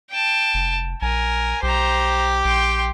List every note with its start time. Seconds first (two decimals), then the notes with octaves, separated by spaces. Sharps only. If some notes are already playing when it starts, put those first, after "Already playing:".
0.10 G5 A5
0.54 F1
1.02 A#1 A#4 G#5
1.63 B1 G4 C5 A#5
2.45 A#1 G5 C6